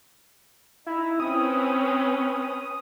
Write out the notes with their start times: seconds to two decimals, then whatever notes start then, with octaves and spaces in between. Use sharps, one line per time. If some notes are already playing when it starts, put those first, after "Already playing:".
0.86 D#4 E4
1.20 C4 C#4 B4 D#6